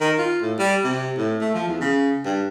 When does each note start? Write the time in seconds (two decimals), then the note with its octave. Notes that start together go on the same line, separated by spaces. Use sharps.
0.01 D#3
0.18 F4
0.42 A2
0.59 G3
0.84 C3
1.18 A2
1.41 A3
1.54 F3
1.68 E2
1.81 C#3
2.24 G2